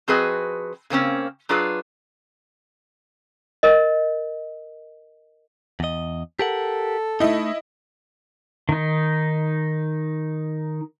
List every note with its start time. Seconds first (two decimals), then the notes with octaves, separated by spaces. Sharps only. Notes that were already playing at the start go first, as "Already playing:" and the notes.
0.08 F3 C4 F#4 G#4 B4 D#5
0.90 C#3 A#3 C4 C#4
1.49 F#3 D4 F4 G#4 B4
3.63 A#4 D#5
5.80 E2 D#5
6.39 G4 A4 A#4 F#5
7.20 A3 D#4 E4 D#5
8.69 D#3 D#4